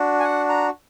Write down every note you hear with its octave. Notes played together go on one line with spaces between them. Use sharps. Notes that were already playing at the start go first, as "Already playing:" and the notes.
Already playing: D4 F#4
G#5
F#5
A#5